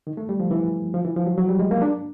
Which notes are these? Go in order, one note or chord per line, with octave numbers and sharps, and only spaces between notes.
D#3
A3
G3
F3
E3
F3
E3
F3
F#3
F#3
G3
G#3
A#3
D4